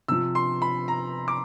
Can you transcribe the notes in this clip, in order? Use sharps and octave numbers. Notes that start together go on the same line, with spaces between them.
C3 F3 E6
C6
B5
A#5
D6